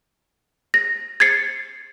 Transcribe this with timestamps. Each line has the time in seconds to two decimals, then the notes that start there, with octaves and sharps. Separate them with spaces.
0.74 A#6
1.20 G#6 A6 C7 C#7